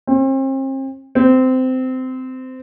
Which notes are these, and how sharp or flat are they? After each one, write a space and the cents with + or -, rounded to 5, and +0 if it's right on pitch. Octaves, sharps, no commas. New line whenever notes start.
C4 +40
C4 -20